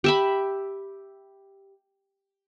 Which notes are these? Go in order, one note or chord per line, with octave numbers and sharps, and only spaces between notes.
G4 E5 B5